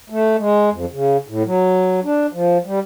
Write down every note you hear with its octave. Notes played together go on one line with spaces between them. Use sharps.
A3
G#3
F2
C#3
A2
F#3
D4
F3
G3